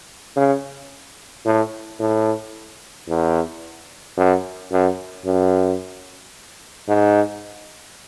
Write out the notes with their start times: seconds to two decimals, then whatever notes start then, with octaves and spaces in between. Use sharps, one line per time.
0.37 C#3
1.46 A2
2.00 A2
3.08 E2
4.17 F#2
4.72 F#2
5.25 F#2
6.89 G#2